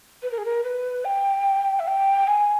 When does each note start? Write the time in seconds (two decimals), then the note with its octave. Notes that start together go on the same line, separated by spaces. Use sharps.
0.23 B4
0.31 A#4
0.38 G#4
0.45 A#4
0.64 B4
1.05 G5
1.80 E5
1.87 G5
2.27 G#5